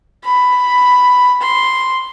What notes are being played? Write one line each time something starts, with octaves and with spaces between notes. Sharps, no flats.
B5
C6